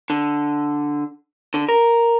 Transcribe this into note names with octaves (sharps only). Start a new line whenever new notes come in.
D3
D3
A#4